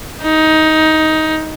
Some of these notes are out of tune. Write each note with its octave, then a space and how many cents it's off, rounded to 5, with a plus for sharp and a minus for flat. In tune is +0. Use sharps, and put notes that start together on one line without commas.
D#4 +15